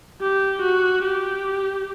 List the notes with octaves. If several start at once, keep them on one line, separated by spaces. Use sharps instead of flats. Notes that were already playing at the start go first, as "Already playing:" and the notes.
G4
F#4
G4